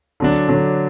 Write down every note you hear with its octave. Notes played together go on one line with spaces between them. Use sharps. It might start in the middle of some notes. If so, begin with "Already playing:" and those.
D3 F#3 D4
D3 F#3 D4